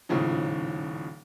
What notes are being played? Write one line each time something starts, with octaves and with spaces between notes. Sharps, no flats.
D#1 A2 C#3 F3 D#4